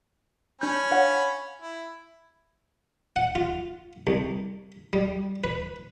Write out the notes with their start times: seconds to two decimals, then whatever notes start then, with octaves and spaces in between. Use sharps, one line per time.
0.61 C#4 D4 B5 G6
0.91 C#5 F5 F#5
1.62 E4
3.16 F#5
3.35 F4
4.07 C2
4.93 G3
5.44 B4